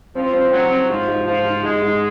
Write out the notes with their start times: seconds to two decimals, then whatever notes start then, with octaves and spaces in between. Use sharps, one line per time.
0.15 F3 C4
0.33 C4
0.51 F#3 C4
0.71 C4
0.89 G#2 F3
1.08 G#2
1.26 G#2 F3
1.45 G#2
1.63 G#2 G#3
1.82 G#2